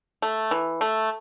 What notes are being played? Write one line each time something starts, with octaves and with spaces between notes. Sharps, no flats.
A3
E3
A3